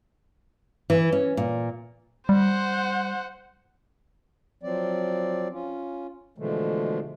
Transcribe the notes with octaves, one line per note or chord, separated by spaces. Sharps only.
E3
C#4
A#2
G3 C5 F#5
F3 F#3 C4 D5
C#4 F4
B2 D3 E3 F3 G#3 A3